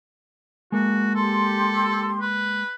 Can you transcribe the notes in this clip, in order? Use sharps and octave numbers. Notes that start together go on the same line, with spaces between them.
G#3 A#3 F#4
G4 A4 C6
B4